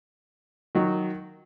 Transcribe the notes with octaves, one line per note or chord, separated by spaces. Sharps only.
D#3 F#3